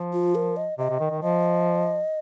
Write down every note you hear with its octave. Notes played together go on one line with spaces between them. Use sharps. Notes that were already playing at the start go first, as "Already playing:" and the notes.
Already playing: F3
F4
A#4
D#5
C3 D#5
C3
D#3
D#3
F3 D#5